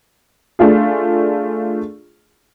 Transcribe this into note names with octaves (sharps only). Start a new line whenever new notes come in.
A3 D4 F4 G#4